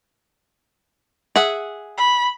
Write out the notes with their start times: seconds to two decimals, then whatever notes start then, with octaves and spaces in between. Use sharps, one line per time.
1.36 G#4 E5 F#5
1.98 B5